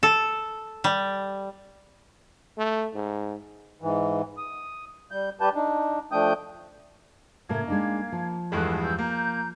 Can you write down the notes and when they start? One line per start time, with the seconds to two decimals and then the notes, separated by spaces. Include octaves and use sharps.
0.03 A4
0.84 G3
2.58 A3
2.94 G#2
3.82 G#2 E3
4.38 D#6
5.11 G3 G6
5.41 G3 G4 B4 A5 G6
5.55 D4 D#4
6.12 F3 A3 D4 G5 D#6 G6
7.49 A2 C#3 A#3 A#4 G#6
7.68 G#3 D4 D#4 F5 G#6
8.12 F3
8.52 E2 G2 G#3 A4 C#6 F#6
8.83 E6 G6
8.99 A#3 A#5 G6